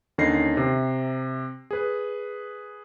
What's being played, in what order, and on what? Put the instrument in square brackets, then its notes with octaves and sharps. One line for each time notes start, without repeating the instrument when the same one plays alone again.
[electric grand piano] D#2 D3 C#4 D#4 A#6 C7
C3
G#4 B4